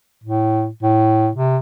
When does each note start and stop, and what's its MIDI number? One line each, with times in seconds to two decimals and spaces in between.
0.24 0.68 45
0.83 1.29 45
1.35 1.58 48